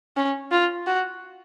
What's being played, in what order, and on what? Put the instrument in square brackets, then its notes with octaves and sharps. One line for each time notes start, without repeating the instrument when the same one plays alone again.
[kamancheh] C#4
F4
F#4